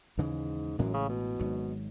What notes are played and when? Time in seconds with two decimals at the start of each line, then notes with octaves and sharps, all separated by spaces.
0.17 D#2 G#2 C#3 E3 G#3
0.78 A1 F#2 A2 E3 G#3
0.94 C#3
1.09 B2
1.39 G#1 G#2 F#3